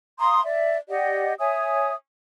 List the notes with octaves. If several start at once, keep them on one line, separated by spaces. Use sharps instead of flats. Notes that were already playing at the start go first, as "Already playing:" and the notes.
F5 A#5 C6 D#6
D5 E5
G4 D5 D#5 F#5
C#5 E5 G#5 D#6